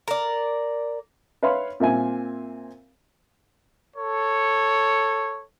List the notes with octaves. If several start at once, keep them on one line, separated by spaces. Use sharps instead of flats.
A#4 D5
B4 C#5 E5 F5 B5 C6
A#2 C4 E5 G#5
A4 C#5